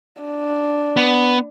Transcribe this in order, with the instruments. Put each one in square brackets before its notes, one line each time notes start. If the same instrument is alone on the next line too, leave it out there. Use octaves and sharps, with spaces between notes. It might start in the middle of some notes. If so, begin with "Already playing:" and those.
[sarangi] D4
[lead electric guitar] B3